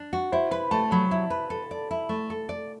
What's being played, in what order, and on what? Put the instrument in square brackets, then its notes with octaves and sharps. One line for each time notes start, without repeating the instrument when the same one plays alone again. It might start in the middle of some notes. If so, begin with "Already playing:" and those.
Already playing: [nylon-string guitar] D4
F#4
[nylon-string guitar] E4 [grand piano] C5
[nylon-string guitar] B4 [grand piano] B5
[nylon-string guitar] A3 [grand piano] A5
[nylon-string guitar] F#3 [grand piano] B5
[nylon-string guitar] E4
B4
A4
D5
E4
A3
A4
D5